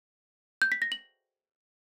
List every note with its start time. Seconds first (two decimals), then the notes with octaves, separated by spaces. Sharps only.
0.62 G6
0.72 B6
0.82 A#6
0.92 F#7